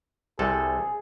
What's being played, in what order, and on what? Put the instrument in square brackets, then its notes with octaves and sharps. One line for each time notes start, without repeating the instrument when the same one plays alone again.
[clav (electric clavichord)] C2 C3 A4 [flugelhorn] G#4